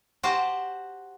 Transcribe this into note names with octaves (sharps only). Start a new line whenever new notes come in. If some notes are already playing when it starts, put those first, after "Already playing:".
F#4 G4 C5 F#5 A5